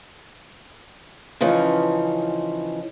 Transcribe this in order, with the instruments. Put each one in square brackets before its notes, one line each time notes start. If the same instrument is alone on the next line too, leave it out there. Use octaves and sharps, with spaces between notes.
[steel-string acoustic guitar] C#3 E3 F3 C#4 D#4